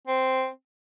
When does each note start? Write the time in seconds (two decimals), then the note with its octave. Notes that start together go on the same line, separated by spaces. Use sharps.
0.08 C4